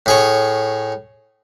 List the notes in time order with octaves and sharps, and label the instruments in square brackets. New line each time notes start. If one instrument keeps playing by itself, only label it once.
[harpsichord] A2 G#4 C#5